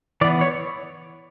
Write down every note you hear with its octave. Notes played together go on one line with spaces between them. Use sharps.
E3 B3 D5
C#5